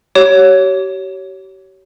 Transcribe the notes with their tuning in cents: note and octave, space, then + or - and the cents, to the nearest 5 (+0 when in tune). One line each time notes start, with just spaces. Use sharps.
G4 -40 C#5 +5